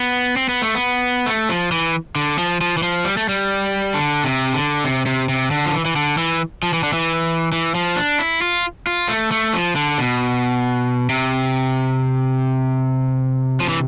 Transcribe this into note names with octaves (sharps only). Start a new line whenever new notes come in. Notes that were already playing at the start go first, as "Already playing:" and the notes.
Already playing: B3
C4
B3
A3
B3
A3
F3
E3
D3
F3
F3
E3
F3
G3
A3
G3
D3
C3
D3
C3
C3
C3
D3
F3
E3
E3
D3
E3
F3
E3
D3
E3
E3
F3
D4
E4
F4
F4
A3
A3
F3
D3
B2
C3
F3
E3